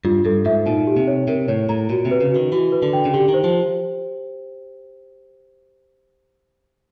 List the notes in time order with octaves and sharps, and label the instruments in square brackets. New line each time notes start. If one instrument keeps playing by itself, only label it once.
[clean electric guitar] G2 [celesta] F4
[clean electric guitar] G2 [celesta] A4
[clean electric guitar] G#2 [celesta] E5
[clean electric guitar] A#2 [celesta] D#4
[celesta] G4
[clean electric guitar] C3
[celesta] C#5
[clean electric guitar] C3 [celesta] A#4
[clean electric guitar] A2 [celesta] C#5
[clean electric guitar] A2 [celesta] A#5
[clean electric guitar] A#2 [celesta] F#4
[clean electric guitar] C3
[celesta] B4
[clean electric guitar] C#3
[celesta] F#4
[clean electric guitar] D#3
[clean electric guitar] E3 [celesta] F#4
[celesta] B4
[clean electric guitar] D3
[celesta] G5
[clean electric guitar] C#3
[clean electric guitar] D3 [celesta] G4
[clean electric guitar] D#3
[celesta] C5
[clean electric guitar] F3